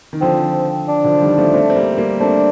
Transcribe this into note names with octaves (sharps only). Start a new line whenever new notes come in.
D#3
D3 F3 C4
D4
D3 F3
F3
D#3 G3
F3 A3
A3 C4
C4
G3 A#3
G3 A#3
A3 C4 D4